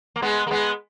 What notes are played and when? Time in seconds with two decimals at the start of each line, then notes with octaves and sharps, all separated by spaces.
0.16 A#3
0.22 G#3 B3
0.47 A#3
0.51 G#3 B3